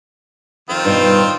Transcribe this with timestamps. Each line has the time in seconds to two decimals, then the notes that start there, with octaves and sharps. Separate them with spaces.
0.69 F2 D#3 C4 F4
0.85 G2 B2 D#4